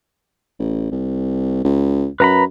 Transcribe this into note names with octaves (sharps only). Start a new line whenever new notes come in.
A1
C2
C#2
F#2 B4 A#5 B5